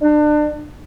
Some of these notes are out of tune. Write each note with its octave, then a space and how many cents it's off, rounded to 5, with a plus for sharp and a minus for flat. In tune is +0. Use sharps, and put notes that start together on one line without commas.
D4 +30